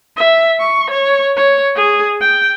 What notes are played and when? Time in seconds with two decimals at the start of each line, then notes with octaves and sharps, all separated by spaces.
0.17 E5
0.59 C#6
0.90 C#5
1.37 C#5
1.76 G#4
2.21 G5